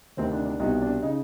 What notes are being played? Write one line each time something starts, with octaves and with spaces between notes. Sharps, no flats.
D2 C3 D#3 C4
D4
D4
C2 B2 D#4
D4
C#3 D#4